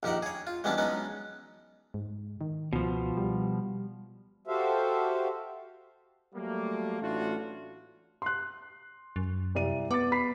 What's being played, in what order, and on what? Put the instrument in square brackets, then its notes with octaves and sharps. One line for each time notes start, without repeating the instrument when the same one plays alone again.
[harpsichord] A#1 D#3 G4 A#4 F#5
G#4 C#5
F4
E3 G3 G#3 B3 C#4 D4
F#3 G#3 B3 C#4 D#4
[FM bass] G#2
D#3
[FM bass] C#2 [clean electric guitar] B2 F3
[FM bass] G3
[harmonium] F#4 G4 A4 C5 E5 F5
[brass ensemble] F#3 G3 A3 A#3
A1 A3 D4 F4 F#4
[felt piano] C6 F#6
[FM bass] F#2
[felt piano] C2 D5 D#7
[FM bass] B3 [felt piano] D6 A6
[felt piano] B5 B6 C7